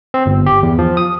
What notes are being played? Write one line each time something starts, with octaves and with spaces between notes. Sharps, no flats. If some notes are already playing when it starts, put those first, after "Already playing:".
C4
G1
G4
E2
F3
D#6